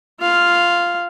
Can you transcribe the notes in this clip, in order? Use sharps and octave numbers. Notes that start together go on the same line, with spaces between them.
F4 F5